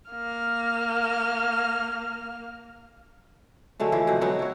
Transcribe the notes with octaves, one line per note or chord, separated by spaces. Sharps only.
A#3 F6
D3 F#3 G#3 A3
E3 F3 G#4
B2 D3 C4
F#3 B3 D#4 F#5
E4 C#5